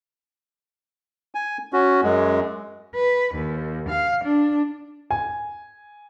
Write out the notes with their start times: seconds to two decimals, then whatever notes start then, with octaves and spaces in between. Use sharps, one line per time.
1.35 G#5
1.73 C#4 F#4
2.03 F#2 G#3
2.95 B4
3.35 D#2
3.89 F5
4.24 D4
5.11 G#5